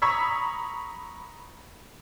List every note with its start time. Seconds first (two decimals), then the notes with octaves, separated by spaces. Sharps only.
0.02 A#5 B5 C#6 D#6 E6 B6